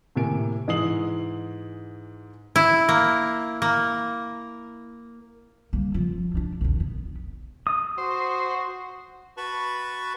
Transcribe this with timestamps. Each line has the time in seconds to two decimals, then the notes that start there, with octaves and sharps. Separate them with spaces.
0.16 A2 C3 A#3 G#5 D7
0.68 G#2 E3 E4 D#6 C7 F#7
2.56 E4
2.89 A#3
3.62 A#3
5.73 G3 A#3
5.94 F3 F4
6.34 G2 D4
6.61 A#1 D#2
6.80 B3
7.67 D#6
7.98 F#4 C5
9.37 F#4 B4 A5 B5 C#6